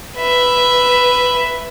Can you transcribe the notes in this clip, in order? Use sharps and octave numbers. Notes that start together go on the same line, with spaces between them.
B4 E5